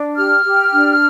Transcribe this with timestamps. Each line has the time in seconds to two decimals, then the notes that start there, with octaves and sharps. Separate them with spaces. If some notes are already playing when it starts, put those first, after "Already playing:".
Already playing: D4
0.16 G4 F6
0.44 G4
0.73 D4